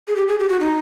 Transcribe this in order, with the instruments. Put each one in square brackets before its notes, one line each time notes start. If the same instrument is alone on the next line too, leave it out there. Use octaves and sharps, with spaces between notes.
[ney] G#4
G4
G#4
G4
F#4
D#4